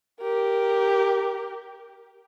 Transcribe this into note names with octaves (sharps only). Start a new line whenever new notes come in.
G4 A#4